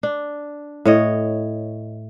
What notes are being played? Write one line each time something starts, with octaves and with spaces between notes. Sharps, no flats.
D4
A2 C#5 D#5